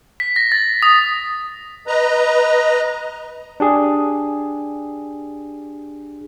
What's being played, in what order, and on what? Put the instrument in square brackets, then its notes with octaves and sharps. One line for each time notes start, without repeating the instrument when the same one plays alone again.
[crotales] B6
A#6
A6
D#6
[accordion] B4 D#5 A#5
[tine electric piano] D4 G4 G#4